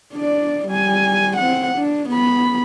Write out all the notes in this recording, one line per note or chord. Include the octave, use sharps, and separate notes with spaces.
D4 D5
G3 G#5
C4 F#5
D4
B3 B5